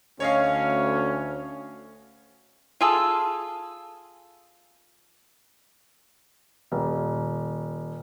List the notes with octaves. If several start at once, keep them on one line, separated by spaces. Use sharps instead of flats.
D2 C#4 C#5 D#5 F5
F4 G#4 A4
D#1